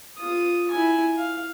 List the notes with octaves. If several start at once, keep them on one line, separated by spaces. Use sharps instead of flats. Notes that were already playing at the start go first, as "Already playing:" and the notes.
F4 D#6
E4 G#5
F5